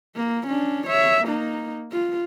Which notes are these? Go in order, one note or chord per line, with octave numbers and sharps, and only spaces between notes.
A#3
C#4 D4
C#5 E5
A#3 D#4
F4